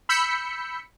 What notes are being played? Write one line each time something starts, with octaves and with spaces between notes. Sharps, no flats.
B5 E6 G6 B6 C#7